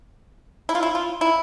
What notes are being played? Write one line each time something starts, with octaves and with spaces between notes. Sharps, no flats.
E4
F4
E4
F4
E4